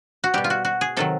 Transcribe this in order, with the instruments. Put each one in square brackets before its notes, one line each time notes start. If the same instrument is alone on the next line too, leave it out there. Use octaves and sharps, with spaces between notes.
[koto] F#4
B2 G3 G4
F4
F#4
F#4
G#4
C3 D#3 F#3 A4